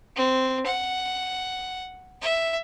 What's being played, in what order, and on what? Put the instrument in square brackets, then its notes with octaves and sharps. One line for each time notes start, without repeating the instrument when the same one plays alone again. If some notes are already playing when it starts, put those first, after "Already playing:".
[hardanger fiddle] C4
F#5
E5